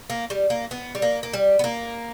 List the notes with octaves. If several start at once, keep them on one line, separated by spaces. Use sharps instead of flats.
A#3
G3
A#3
B3
G3
A#3
A#3
G3
B3
A#3